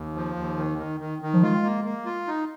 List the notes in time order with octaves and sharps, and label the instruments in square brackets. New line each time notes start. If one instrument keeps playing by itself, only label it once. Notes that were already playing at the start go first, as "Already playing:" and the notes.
Already playing: [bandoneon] D#2
F3
D#2
D#3
D#3
D#3
D#3
[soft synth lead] F3
[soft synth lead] G#3 [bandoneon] F4
[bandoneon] A#3
A#3
F4
D#4